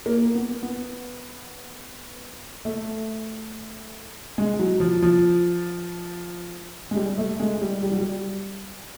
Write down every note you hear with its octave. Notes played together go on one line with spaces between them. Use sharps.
A#3
B3
B3
A3
G#3
F#3
F3
F3
G#3
G3
A3
G#3
G3
G3
F#3
G3